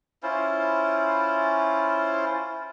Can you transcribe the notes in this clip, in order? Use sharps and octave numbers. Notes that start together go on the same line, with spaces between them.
C#4 E4 F4 C5